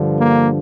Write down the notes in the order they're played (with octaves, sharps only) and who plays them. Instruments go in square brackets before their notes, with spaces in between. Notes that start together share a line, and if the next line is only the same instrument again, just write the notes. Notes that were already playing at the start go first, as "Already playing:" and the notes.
Already playing: [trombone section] G2 D3 F3
A#3